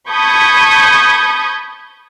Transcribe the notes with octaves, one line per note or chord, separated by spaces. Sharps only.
A5 B5 C#6 D#6 G6 G#6